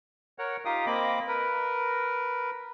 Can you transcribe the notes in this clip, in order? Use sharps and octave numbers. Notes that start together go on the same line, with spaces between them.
A#4 C#5 F#5
D#4 F4 G4 F5 G5 D#6
A#3 C4 D#5 B5 D6
A#4 B4